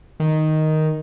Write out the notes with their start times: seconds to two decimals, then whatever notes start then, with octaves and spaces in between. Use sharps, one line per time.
0.20 D#3